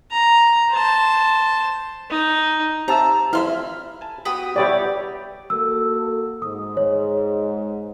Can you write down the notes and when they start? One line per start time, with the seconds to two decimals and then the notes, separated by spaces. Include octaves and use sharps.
0.11 A#5
0.71 C5 A5
2.10 D#4
2.88 C4 G4 E5 A5 A#5 E6
3.33 F2 E3 E4 B5 C6 F6
3.50 E5
4.01 G#5 A5
4.25 B3 F#4 G4 B4 D#6
4.56 G3 B3 E4 G4 C#5 D5
5.50 A#3 F#4 A4 E6
6.42 G#2 D#6
6.77 C#5